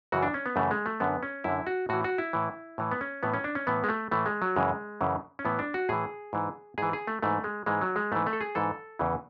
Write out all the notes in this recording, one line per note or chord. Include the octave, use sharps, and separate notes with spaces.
F#2 C#3 E3 F#4
D4
C#4
B3
F#2 C#3 E3 A3
G#3
A3
F#2 D3 B3
C#4
F#2 D3 E4
F#4
A2 E3 F#4
F#4
E4
A2 E3
A2 E3
B3
C#4
A2 E3 B3
C#4
D4
C#4
A2 E3 B3
G#3
A3
A2 E3 A3
G#3
F#3
F#2 C#3 E3 G#3
F#2 C#3 E3
C#4
A2 E3 B3
D4
F#4
A2 E3 G#4
G#2 E3
G#2 E3 G#4
G#4
A3
G#2 E3 A3
G#3
G#2 E3 G#3
F#3
G#3
G#2 E3 A3
A3
A4
G#4
G#2 E3 A4
E2 C#3 E3